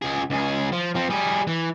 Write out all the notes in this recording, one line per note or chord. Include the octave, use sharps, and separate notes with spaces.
C#2 G#4
C#2 G#4
F3
F3 C4
G3 G#4
E3